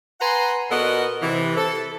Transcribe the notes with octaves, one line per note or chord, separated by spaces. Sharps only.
B4 F#5 G#5 A#5 C6
A#2 B3 F#4 A4 A#4 D#5
C3 E3
A4